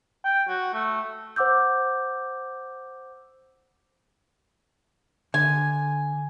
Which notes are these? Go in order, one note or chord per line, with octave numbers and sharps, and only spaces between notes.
G5
F#4
A3
C5 F#5 D6 E6 G6
D3 G#5